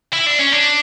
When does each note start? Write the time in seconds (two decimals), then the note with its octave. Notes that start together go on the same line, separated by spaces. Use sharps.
0.13 E4
0.26 D4
0.39 C#4
0.52 D4